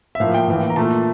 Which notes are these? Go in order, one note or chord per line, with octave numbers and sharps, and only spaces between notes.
E5
A2 F3 A#3 F5
G5
A2 E3 A#3
A#5
A#2 A3 A5